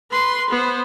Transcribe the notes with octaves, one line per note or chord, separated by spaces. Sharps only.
B4 C6
B3 C5